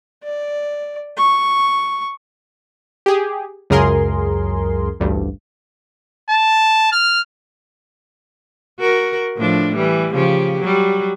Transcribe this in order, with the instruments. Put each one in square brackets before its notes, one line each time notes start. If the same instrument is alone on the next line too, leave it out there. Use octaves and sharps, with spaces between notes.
[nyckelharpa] D5
C#6
[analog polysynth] G4 G#4
C#2 F#2 C#3 G#4 A#4 C6
A1 D2 G2
[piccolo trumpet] A5
F6
[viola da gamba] F#4 A#4
A2 F3 D4
E3 G3
C#3 F3 G4
F#3 G3